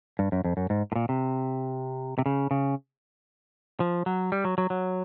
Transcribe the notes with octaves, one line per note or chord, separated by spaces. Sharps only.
G2
F#2
F2
F#2
G#2
A2
A#2
C3
C3
C#3
C#3
F3
F#3
G3
F#3
F#3
F#3